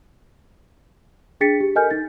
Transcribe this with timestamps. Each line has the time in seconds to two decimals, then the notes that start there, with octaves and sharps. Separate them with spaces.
1.40 D4 G#4 G5 A6 B6 C#7
1.60 G4
1.76 A4 A#4 D#5 G#5 F6 G6
1.91 D#4 A6